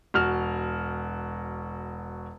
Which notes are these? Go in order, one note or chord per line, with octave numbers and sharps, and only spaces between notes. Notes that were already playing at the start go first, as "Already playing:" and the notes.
E1 F#4 F6